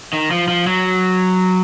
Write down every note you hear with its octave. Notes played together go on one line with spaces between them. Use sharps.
D#3
F3
F3
F#3